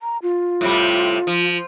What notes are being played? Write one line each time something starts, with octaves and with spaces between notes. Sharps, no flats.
A#5
F4
A2 C3 G3
F3